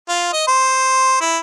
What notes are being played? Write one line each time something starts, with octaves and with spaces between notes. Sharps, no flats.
F4
D#5
C5
E4